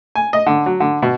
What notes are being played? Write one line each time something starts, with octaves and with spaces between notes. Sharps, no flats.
G#5
D#5
D3
F#3
D3
B2